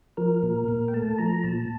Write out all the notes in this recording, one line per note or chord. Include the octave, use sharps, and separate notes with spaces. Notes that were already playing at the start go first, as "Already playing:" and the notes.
F3 A#4
A#2
A#2
G5
A3 A5
F3 A#5
A#2 A5